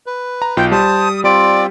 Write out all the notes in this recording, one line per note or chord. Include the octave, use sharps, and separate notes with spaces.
B4
A#5
B1 F4 G5
G3 C5 A5 D#6
G3 C4 F4 D5